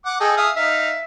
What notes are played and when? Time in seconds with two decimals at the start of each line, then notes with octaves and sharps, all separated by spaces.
0.06 F#5 D6
0.21 G#4 A4 D#5 G5
0.37 E5 F5 D#6
0.56 D#4 E5 F5